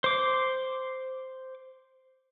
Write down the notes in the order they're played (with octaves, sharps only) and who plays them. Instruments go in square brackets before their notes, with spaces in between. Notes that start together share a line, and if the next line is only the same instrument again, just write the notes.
[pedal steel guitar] C5 D6